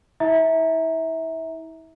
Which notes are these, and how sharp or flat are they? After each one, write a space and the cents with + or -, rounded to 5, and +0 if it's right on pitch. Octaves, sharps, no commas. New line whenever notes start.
E4 -40 E5 -25 A#5 +0